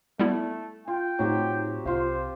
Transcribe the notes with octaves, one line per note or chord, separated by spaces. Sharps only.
G3 A3 B3 E4
F4 G5
A2 F#3 C4 D#4 F#4 G4
C2 F4 C5 F5